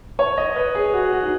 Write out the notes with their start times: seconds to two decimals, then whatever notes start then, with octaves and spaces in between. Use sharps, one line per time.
0.19 C#5
0.37 D#5
0.56 B4
0.75 G#4
0.94 F#4
1.12 F#4
1.23 D#4